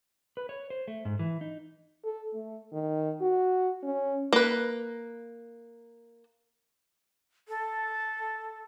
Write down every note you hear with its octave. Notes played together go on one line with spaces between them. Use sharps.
B4
C#5
C5
A3
G#2
E3
D#4
A4
A3
D#3
F#4
C#4
A#3 B4
A4